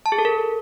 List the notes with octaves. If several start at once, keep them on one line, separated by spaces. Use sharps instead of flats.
A5
G#4
A4
A#4